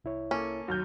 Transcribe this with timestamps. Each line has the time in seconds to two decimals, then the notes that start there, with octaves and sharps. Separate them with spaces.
0.04 C2 E4 C#5
0.31 A#3 C#4 A4
0.68 D#2 F#3 F6 G6